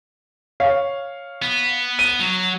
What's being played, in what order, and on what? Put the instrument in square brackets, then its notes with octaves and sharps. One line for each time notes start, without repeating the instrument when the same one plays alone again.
[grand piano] C#5 F5
[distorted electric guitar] B3
[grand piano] D#7
[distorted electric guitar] F#3